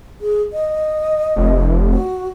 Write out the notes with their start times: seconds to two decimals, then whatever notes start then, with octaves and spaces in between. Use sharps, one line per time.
0.21 G#4
0.53 D#5
1.36 F1
1.93 F#4